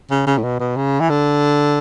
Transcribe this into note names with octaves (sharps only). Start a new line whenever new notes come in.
C#3
C#3
A2
B2
B2
C#3
E3
D3